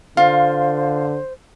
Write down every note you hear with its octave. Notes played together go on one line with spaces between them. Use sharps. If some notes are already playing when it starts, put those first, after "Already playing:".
D3 F4 C5 F5